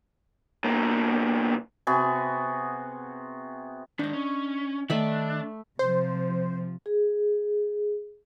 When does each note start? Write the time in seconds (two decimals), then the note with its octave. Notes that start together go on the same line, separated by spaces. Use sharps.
0.64 B1 A#3
1.87 C3 B3 F#4 G#4
3.99 G#2 D#3 D4 D#5
4.13 C#4
4.90 D#3 A3 D4 E5 B5
5.79 C3 F3 C5
6.86 G#4